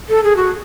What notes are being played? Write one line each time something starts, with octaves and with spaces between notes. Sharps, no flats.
A4
G#4
F#4